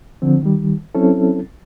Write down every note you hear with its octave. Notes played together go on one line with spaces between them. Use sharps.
D3 F3 C4
D#3 G3
F#3 C4 C#4 E4 A4